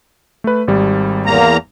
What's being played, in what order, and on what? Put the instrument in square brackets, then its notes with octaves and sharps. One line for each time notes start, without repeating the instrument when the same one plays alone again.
[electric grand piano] A3 B4
G#1 G3
[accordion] E2 A#3 A#5